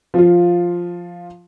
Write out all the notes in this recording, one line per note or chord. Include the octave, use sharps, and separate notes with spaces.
F3 F4